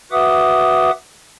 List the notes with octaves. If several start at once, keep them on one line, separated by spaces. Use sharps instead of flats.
F#4 B4 E5 F#5 D6 D#6